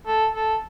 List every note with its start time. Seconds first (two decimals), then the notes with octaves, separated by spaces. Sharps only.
0.07 A4
0.35 A4